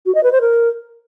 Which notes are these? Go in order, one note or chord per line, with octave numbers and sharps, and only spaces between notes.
F#4
D#5
B4
C5
A#4